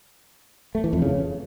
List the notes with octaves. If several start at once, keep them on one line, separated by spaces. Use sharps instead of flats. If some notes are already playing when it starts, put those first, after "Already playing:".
A3
E3
F2
C#3